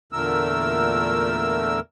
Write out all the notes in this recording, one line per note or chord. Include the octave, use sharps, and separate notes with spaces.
E2 A#2 D3 A3 A#4 E6